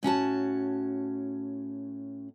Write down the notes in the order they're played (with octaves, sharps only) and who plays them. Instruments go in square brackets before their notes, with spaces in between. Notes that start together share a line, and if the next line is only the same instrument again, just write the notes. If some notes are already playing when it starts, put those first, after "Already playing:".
[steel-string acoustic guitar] A2 C#4 F#4 A5